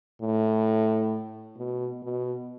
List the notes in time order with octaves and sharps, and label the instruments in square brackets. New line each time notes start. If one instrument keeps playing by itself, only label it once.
[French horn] A2
B2
B2